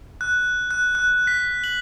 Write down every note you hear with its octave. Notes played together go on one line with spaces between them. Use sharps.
F#6
F#6
F#6
B6
F#7